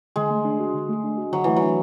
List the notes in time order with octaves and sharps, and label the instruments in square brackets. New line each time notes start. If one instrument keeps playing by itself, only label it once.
[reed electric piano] D3 [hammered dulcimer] G#3
[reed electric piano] A3
D4
F#4
D3
A3
D4
F#4
[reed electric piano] D3 [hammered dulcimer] F#3
[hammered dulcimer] E3 [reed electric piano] A3
[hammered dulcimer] F#3
[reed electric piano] D4